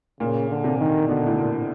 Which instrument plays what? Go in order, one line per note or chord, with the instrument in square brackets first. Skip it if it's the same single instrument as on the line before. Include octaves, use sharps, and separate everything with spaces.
[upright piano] A#2 [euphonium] C#3
[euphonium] D3
[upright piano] C3
[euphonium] D#3
[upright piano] B2 [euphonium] D3
[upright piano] A2
A#2